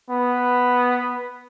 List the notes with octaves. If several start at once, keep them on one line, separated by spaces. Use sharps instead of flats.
B3